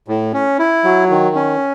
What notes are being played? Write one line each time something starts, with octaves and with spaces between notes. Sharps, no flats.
A2
C#4
E4
F#3
D#3
C#4